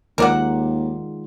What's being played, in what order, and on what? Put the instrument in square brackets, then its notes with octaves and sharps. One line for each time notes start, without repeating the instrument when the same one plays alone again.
[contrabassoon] D#2 [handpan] D#3 G#3 F4 [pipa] A#4 D5 F#5